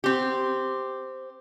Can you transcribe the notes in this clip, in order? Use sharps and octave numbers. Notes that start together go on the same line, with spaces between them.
C4 G4